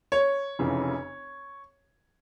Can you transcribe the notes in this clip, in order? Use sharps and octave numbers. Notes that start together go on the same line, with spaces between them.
C#5
F1 F2 C#3 E3